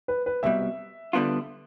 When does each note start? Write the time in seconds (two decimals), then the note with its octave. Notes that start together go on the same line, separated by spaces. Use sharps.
0.08 B4
0.26 B4
0.43 C2 B2 G3 E5
1.13 D3 G3 B3 D4 F4